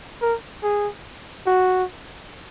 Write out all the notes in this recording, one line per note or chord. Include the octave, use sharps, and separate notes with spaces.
A#4
G#4
F#4